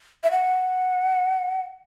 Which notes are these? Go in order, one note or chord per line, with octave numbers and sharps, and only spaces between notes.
E5
F#5